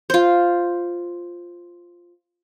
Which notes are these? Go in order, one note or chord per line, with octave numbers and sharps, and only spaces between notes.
F4 C5